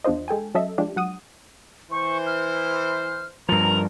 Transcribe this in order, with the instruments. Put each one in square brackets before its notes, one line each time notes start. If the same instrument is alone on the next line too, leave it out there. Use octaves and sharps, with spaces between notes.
[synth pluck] E2 D4 F4 C5 D#5
G#3 A4 G5 G#5
F#3 C#4 A4 D#5 E5
F3 G#3 D4 F4 G4
F#3 F#5 D#6 D#7
[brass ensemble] E3 C5 [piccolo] C#6
[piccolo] F6
[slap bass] G2 F3 [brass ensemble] A#4 [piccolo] F7